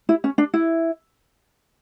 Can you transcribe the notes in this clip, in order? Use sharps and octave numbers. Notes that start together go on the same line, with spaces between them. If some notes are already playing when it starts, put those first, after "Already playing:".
E4
C#4
D4
E4